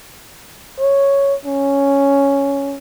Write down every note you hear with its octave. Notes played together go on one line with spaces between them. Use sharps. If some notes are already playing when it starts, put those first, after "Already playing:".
C#5
C#4